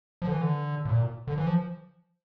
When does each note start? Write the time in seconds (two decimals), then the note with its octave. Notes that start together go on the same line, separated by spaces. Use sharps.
0.22 F3
0.27 D3
0.32 E3
0.41 D3
0.85 A2
0.89 A#2
1.27 D3
1.38 E3
1.47 F3